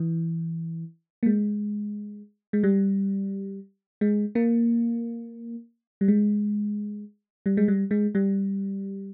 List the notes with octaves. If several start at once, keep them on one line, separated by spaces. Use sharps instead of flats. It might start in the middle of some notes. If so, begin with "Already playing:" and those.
Already playing: E3
A#3
G#3
G#3
G3
G#3
A#3
G3
G#3
G3
G#3
G3
G#3
G3